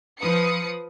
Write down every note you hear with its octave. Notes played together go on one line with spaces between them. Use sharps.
F3 B4 D#6 C#7